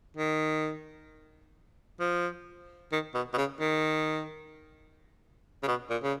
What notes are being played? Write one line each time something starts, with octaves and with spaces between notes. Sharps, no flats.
D#3
F3
D#3
B2
B2
C#3
D#3
C#3
B2
A#2
C#3